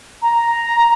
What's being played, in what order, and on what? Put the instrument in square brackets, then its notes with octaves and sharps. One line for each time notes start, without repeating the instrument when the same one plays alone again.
[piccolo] A#5